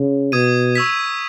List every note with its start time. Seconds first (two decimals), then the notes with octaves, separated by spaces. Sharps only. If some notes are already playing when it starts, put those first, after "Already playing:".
Already playing: C#3
0.32 B2 D#6 G#6 D#7
0.75 C#6 E6 G#6 B6